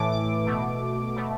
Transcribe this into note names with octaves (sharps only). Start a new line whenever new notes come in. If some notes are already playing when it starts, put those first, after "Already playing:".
Already playing: A2 E3 A3 D6
D6
B2 A3
B2 A3